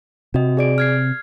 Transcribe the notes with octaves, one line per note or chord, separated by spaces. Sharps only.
C3 F#4 D#5
G#4 D5 D7
F6 G#6 C7